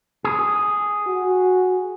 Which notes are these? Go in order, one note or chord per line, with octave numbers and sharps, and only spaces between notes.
G#4
F#4